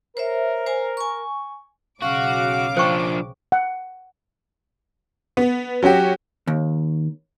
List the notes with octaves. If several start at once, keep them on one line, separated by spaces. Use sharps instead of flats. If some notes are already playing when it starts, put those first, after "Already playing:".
A#4 C5 C#5 E5
C5 G#5 A#5
G#5 C#6
B1 C#3 F#4 F5 D6
F3 D4 C5 G5 C#6
F#5
B3
F#3 C#4 F#4 G4
D#2